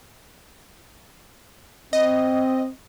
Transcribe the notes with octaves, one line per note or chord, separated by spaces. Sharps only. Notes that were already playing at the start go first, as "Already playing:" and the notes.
C4 D#5